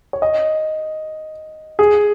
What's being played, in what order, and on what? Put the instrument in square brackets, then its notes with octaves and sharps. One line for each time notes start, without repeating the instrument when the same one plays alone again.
[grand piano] C#5
D#5
G#4